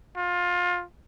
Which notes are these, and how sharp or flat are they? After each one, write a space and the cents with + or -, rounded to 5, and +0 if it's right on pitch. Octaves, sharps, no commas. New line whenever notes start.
F4 +25